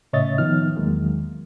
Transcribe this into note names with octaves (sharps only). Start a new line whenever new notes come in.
A2 C#3 C#5 D#5 E5 A6
D#3 F3 B3 D#4 F6
E2 D#3 F#3 G#3 A#3